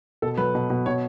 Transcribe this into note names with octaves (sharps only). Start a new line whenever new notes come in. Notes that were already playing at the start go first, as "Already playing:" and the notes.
B2 A4
F#3 B4
B2
B2
B2 C#5